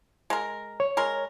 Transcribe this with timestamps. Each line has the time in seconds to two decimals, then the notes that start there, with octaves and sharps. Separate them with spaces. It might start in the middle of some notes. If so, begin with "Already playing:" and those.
0.30 G#3 A#4
0.80 C#5
0.97 G#3 A#4